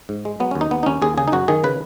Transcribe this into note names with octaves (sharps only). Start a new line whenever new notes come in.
G#2
G#3
F#3 B3
D#2 C#4
D#4
D#2 B3
D#4
D#2 C#4
D#2 G#4
C#3 G#4
D#4
F#2 F#4
D#3 G#4
C#3 B4